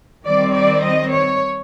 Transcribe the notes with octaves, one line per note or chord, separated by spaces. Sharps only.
D#3 G3 C4 D5
D5
D#5
C#5